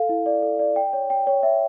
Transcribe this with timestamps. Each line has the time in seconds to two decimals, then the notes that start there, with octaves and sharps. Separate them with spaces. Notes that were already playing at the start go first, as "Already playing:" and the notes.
Already playing: A4 F5
0.09 E4
0.26 D5
0.42 A4
0.59 D5
0.76 G5
0.93 C#5
1.10 G5
1.27 C#5
1.43 E5